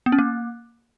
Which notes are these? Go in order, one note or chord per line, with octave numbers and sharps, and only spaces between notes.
B3
C#4
A#3